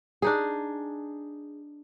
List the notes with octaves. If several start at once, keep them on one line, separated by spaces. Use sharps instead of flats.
D4 D#4 G#4